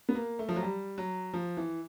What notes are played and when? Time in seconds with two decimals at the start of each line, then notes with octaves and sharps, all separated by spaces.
0.09 B3
0.15 A#3
0.39 A3
0.49 F3
0.56 F#3
0.63 G3
0.98 F#3
1.34 F3
1.57 E3